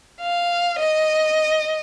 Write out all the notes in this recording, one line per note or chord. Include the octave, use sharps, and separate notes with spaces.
F5
D#5